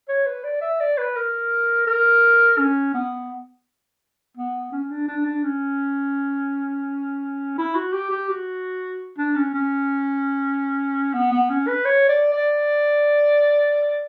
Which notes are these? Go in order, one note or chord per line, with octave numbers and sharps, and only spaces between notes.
C#5
B4
D5
E5
D5
B4
A#4
A#4
C#4
B3
B3
C#4
D4
D4
D4
C#4
E4
F#4
G4
G4
F#4
D4
C#4
C#4
B3
B3
C#4
B4
C#5
D5
D5